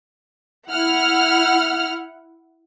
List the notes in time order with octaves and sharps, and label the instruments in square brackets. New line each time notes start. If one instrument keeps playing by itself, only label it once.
[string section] E4 F#5 F6